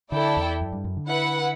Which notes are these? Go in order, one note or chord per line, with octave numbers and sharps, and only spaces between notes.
D3 E4 A4 D5 G5
E2
F#2
G2
F#2
D3
E4 B4 F#5